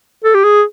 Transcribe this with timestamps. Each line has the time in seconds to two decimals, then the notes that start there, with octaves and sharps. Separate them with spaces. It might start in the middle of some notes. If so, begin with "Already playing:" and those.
0.24 A4
0.35 G4
0.44 G#4